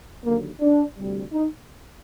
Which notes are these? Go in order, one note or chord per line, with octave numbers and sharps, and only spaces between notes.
D#2 D3 F#3 A#3
D4
D2 C3 G3
D#4